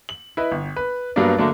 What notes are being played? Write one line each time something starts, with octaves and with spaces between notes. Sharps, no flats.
F#7
E4 B4 D#5
G1
B4
G2 F#3 G3 A#3 B3 D4
D3 F#3 A3 A#3 D4